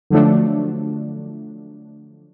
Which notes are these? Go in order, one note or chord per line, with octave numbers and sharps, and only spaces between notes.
D3 F3 F#3 A3 D4